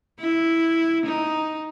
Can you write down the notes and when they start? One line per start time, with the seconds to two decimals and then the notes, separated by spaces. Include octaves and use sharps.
0.20 E4
1.06 D#4